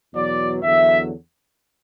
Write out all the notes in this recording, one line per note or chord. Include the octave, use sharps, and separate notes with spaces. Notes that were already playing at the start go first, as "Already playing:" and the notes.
E2 B2 F#3 D5
E2 D3 F#3 E5